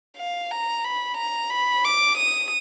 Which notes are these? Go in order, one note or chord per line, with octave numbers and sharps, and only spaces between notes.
F5
A#5
B5
A#5
B5
D6
D#6